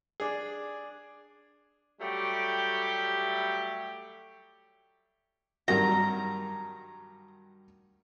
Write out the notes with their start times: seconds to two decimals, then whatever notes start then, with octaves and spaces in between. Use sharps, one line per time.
0.20 D4 G#4
2.01 F#3 G3 A3 G4
5.68 G2 D#3 F#3 A#5